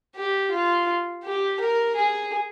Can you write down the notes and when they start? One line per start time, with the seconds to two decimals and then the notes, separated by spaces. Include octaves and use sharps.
0.16 G4
0.51 F4
1.24 G4
1.60 A#4
1.95 G#4